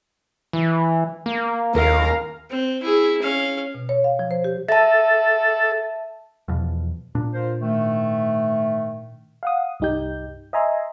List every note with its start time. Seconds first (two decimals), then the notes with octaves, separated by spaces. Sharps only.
0.53 E3
1.26 A#3
1.75 D#2 A#4 F5
2.50 C4
2.82 E4 G#4
3.22 C#4 F5
3.74 B2
3.89 C#5
4.04 F5
4.19 F3
4.31 C5
4.44 G4
4.69 A4 E5 A5
6.48 E2 B2 F3
7.15 A#2 D4
7.32 F4 A#4 C5
7.59 G#2 D#3 A3
9.43 F5 F#5 D#6
9.80 C2 G2 D#4 G4 G6
10.53 D#5 E5 G#5 A#5 C6